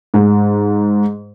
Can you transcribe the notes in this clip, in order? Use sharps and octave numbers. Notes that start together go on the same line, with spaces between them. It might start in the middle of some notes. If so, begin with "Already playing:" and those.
G#2